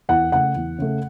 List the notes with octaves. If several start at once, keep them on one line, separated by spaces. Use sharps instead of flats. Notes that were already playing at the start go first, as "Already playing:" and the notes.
E2 F#5
C#3 A3 F#5
E2
C#3 A3